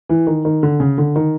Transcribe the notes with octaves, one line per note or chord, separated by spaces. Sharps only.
E3
D#3
D#3
D3
C#3
D3
D#3